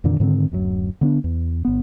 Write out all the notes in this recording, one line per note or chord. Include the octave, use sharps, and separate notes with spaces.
F2 A#2 D3 D#3
G#2 D3 D#3 C4
D1 F#2 F#3
D3 B3 D4
E2
G1 B3